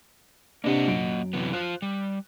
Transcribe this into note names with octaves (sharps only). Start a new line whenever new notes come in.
C3 A#3 D4 D#5 F#5
F#2 D7
C3 E3 B3
F4 C5 F#6
G3